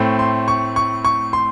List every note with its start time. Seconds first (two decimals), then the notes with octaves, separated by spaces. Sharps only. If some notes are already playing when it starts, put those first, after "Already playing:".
Already playing: A2 A3 C4
0.19 C6
0.48 C#6
0.76 C#6
1.05 C#6
1.33 C6